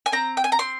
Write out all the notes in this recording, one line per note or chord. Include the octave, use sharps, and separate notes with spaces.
G#5
C4 A#5
G5
G#5
A#5
C4 C6